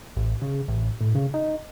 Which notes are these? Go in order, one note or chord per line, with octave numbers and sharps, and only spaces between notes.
A1
C#3
A1
A2
C#3
D#4